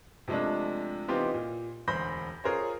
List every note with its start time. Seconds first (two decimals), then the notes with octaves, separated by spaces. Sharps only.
0.28 C3 F3 G#3 A3 D4
1.08 E3 B3 C4 D#4 F4 G4
1.34 A#2
1.88 E1 D2 C5 B5 G6 A#6
2.44 F4 G#4 A#4 C5 C#5